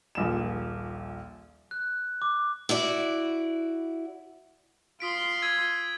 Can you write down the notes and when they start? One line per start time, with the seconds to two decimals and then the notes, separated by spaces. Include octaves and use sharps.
0.15 D#1 A#1 E7
1.71 F#6
2.22 D6
2.69 E4 F#4 D5
5.00 F4 C6 D#6 B6 D7
5.42 E6 G#6 D#7